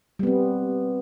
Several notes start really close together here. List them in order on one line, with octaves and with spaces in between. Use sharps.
G3 B3 C4